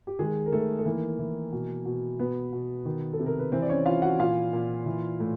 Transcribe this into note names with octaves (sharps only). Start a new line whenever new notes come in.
G4
D#3 G#3 G#4
A#4
D#3 A3 A4
A4
E3 A#3 A#4
E3
B2
B2
B2 B3 B4
B2
D#3
A4
C3
A#4
B4
E3 C4 C5
D5
C#4 C#5
E3 F4 F5
F#4 F#5
A#2 F4 F5
A#2
E3
A2